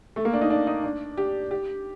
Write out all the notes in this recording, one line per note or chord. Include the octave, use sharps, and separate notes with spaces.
A3
A#3
D4
D#4
D4
D#4
D4
G4
G4